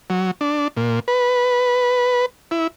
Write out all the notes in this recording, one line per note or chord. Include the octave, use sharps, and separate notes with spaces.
F#3
D4
A#2
B4
E4